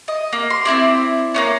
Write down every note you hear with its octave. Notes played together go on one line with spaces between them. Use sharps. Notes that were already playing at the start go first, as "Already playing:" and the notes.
D#5
A#3
C6
C4 C#4 E4 D5
A#3 B3 C#4